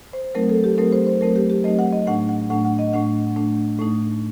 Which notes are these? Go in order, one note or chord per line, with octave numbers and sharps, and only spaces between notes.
C5
F#3 A3 C4 D#4 A#4
A4
G4
F#3 A3 C4 D#4 A#4
C5
C5
F#3 A3 C4 D#4 A#4
G4
G4
F#3 A3 C4 D#4 D#5
F#5
D#5
A2 A3 D4 F#5
F#5
A2 A3 D4 F#5
F#5
D#5
A2 A3 D4 F#5
A2 A3 D4
A2 A3 D#4